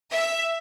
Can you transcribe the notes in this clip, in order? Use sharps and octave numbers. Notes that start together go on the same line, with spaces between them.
E5